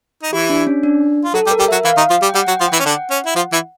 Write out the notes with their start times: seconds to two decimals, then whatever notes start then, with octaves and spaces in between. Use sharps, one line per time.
0.23 D#4
0.33 E3 E4 G4
0.50 D4
0.67 C#4
0.83 D4
1.24 F4
1.34 F#3 F#4 A4
1.47 G3 G4
1.51 A#4
1.59 G3 G4
1.68 F#3 F#4 E5
1.85 E3 E4 F5
1.97 D#3 D#4
2.10 F3 F4
2.22 G3 G4
2.29 G5
2.34 G3 G4 F#5
2.48 F#3 F#4
2.52 G5
2.60 F3 F4
2.68 E3 E4 G5
2.79 C#4
2.85 D3 D4 F#5
3.11 C#4
3.26 E4
3.36 F3 F4
3.52 E3 E4